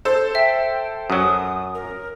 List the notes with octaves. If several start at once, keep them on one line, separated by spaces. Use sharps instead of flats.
A4 C5
E5 G5
F#2 F#3 D#6
A#4